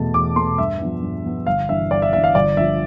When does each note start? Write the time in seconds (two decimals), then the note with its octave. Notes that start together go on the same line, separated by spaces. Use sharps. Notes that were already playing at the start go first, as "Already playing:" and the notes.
Already playing: E2 B2 A3 A5
0.14 E2 D6
0.36 B2 A3 C6
0.58 G2 E5
0.81 F3 B3 D4
1.02 G2
1.25 F3 B3 D4
1.47 G1 F5
1.69 G2 E3 E5
1.90 G1 D5
2.02 E5
2.13 G2 E3 E5
2.24 F5
2.35 G1 D5
2.57 G2 F3 E5